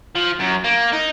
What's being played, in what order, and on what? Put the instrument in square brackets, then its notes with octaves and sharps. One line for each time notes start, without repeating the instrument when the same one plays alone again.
[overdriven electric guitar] F3
F#2
A#3
D#4